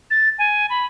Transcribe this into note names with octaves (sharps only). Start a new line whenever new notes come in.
A6
G#5
B5